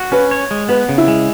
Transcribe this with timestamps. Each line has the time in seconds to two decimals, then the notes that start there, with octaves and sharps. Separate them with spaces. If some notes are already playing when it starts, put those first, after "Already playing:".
Already playing: F#4
0.12 C#4 B4
0.31 C#5
0.51 G#3
0.69 B3 B4
0.89 C#3
0.98 E4
1.08 G#3